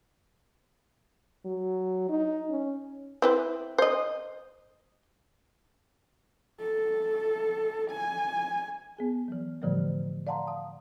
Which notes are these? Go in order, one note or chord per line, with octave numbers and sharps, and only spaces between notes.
F#3
D#4
C#4
C4 E4 B4
C5 D#5
A4
G#5
B3 G#4 G#5
E3 F#3
A2 D3 E3 F3 G3 A3
D5 F5 F#5 A5 A#5 C6
F5 D#6